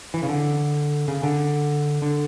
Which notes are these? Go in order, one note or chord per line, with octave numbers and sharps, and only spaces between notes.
E3
C#3
D3
C#3
D3
D3